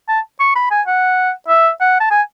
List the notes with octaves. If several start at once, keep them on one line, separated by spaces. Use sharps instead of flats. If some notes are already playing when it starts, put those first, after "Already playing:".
A5
C#6
B5
G#5
F#5
E5
F#5
A5
G#5